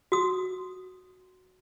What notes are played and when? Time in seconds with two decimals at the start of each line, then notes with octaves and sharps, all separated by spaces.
0.12 F#4 D#6